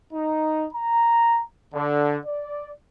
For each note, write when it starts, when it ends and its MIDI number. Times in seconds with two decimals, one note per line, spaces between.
0.14 0.66 63
0.74 1.41 82
1.74 2.17 50
2.26 2.71 74